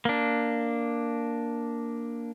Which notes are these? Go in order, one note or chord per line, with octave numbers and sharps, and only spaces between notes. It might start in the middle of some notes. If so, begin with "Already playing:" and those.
A#3 D4